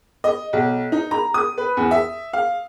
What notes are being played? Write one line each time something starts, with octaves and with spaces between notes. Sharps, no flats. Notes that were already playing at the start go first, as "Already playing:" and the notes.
D#5
B1
D#4
A#5
D#6
B4
E2
E5
F5